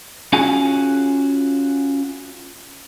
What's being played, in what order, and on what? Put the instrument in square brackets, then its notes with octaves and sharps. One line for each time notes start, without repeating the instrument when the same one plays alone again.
[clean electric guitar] C#4 F4 F#4 G#4 G#5